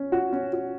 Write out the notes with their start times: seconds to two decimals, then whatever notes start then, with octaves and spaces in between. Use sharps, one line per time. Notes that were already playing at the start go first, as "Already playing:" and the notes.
Already playing: C#4
0.12 F#4
0.33 C#4
0.53 F#4